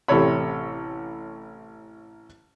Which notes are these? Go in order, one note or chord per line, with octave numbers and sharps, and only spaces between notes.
A1 C3 A4 C#5 B5